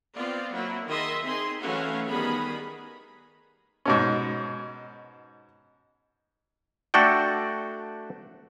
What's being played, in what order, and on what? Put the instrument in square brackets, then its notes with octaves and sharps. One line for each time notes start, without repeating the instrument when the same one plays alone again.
[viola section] B3 C4 F4 D5
F#3 A#3 E4 F#4
D#3 G#4 D#5 E5 C6
C4 D#4 G#4 C6
E3 F#3 A3 C#4 F#4 F5
D#3 G3 B3 G#4 B5
[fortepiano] G#2 B2 C#4
[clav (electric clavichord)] A3 D4 F#4 A4 D5 G5